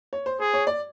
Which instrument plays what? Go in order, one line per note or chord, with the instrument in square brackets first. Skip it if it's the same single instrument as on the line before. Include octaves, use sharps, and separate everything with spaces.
[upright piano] C#5
C5
[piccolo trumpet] G#4 [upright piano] C5
[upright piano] C#5
D5